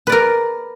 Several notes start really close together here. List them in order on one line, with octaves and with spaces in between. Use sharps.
B4 D5 A#4